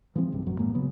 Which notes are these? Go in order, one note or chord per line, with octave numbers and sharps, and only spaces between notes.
E3 F3 G#3 C4
B1 G2 C3
A1 F#2 F#3
A2 G#3 A#3
C#3 F#3 B3